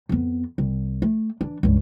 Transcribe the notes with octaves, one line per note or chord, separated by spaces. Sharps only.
F2 B3
C2
A3
E3 D4
C#2 G2